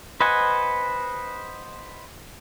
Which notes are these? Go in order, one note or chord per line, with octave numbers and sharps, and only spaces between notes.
B4 C5 D#5 F#5 G#5